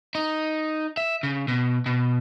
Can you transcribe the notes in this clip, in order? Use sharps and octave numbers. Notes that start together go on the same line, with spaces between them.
D#4
E5
C#3
B2
B2